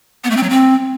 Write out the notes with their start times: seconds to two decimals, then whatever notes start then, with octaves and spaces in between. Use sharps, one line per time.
0.24 B3
0.30 A3
0.37 C4
0.43 F#3
0.50 C4